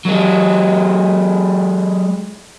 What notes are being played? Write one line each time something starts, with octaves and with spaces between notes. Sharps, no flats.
F#3 G#3